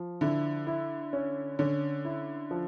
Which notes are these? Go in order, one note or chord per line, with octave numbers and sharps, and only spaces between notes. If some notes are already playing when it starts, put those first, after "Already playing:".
Already playing: F3
D3 E4
E4
C#4
D3 C#4
E4
F3